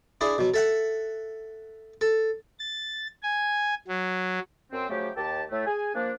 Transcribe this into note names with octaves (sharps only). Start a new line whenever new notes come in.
D4 E4 G#4
B2 F#3
A4 E5 F#5
A4
A6
G#5
F#3
F#2 C4
C#3 F3 F#3 A3 G4
D#2 G4 A5
A2 A3
G#4 G#5
F3 A#3 D4